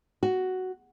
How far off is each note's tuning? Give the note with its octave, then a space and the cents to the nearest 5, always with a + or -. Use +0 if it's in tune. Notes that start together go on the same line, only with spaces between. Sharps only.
F#4 +5